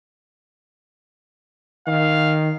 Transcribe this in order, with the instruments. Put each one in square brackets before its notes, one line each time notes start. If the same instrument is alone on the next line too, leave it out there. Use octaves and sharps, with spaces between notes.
[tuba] D#3 [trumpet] F5